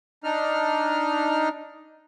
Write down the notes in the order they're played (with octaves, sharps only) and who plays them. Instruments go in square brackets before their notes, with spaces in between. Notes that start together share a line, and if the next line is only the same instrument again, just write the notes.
[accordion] D4 D#4 F6